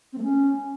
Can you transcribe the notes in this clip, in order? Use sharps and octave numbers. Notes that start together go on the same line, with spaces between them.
C4
A3
C#4